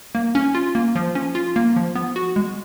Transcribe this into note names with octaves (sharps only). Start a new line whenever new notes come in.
A#3
C#4
F4
A#3
F3
C#4
F4
A#3
F3
B3
F#4
G#3